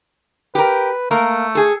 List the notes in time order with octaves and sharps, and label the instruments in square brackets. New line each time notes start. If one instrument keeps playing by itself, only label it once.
[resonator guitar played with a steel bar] G4 A#4 [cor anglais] B4
[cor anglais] A3 [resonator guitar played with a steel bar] A#3 A#4
[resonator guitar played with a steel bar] G#4 A4